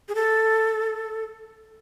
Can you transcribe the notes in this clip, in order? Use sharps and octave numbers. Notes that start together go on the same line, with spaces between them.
G#4
A4